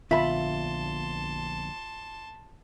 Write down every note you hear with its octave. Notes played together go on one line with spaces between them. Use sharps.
A#1 D3 B3 F4 E5 A5 B5 C6